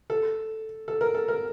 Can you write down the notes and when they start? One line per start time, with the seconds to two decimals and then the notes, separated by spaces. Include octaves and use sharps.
0.10 A4
0.88 A4
1.01 A#4
1.14 A4
1.28 A#4